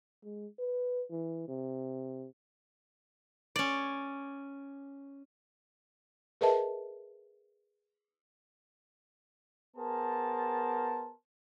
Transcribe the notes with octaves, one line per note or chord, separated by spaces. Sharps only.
G#3
B4
E3
C3
C#4 D5
G#4 A#4 B4 D#5 E5 A5
B3 G#4 A#4 C5 A5